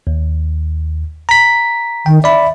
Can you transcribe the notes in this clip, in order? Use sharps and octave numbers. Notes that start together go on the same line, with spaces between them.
D#2
A#5 B6
D#3 G5
D5 E5 B5